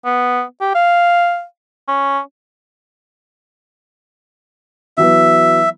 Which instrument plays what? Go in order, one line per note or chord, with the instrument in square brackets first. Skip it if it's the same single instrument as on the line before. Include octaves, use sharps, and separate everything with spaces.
[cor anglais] B3
G4
F5
C#4
[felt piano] E3 F#3 B3 [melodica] E5